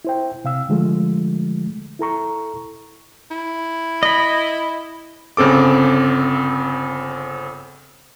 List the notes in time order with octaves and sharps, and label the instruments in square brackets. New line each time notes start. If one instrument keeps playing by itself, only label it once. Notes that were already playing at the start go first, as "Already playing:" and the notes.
[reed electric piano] E4 C5 G5
C3 F5 E6
D3 F3 G#3 A3
E4 A4 A#5 C#6
[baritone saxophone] E4
[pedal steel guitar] D#5 B5
[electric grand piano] G1 C#3 C4 A4 D6